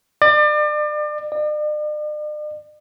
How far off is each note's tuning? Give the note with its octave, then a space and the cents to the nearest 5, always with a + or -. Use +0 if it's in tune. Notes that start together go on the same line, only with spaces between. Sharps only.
D5 +35
D5 +45